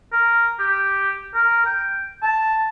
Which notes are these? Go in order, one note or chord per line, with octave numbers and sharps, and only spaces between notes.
A#4
G4
A#4
G5
A5